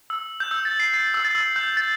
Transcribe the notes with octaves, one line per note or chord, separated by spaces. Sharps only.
E6
G6
E6
A6
C7
A6
E6
A6
E6
G6
A6